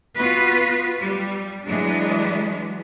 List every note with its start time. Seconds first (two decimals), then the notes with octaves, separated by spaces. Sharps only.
0.17 B3 F4 F#4 B4
1.01 G3
1.65 E3 F#3 G#3 D4